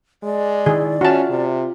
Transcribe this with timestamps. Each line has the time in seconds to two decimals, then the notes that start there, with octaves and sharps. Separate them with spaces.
0.23 G#3 D5
0.66 D#3 E4 G#4
1.01 C#4 F4 F#4 E5 A5
1.30 C3